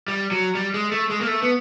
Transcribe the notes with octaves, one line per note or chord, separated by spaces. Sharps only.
G3
F#3
G3
G#3
A3
G#3
A#3
A3
B3